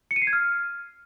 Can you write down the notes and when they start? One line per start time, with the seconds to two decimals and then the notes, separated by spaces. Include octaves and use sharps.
0.11 C#7
0.16 D#7
0.22 C7
0.27 G#6
0.33 F6